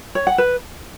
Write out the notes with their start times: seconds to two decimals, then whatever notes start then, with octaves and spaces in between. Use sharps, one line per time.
0.15 C#5
0.27 F#5
0.38 B4